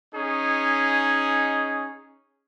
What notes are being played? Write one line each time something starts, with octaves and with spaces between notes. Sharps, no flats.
C#4 D#4 G#4